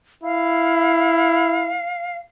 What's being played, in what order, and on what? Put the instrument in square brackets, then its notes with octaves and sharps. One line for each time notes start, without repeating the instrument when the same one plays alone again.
[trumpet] E4 [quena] F5